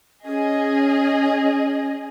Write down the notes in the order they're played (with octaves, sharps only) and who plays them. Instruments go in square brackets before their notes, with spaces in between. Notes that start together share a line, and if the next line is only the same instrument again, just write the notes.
[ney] C#4 [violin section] G#4 D#5